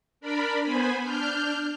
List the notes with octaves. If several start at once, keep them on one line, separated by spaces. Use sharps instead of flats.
D4 A#4 D5 B5
B3 C5 G#5 B5
D4 F6 G6